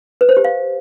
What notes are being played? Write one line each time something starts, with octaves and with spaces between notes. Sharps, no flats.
B4
C5
G4
F5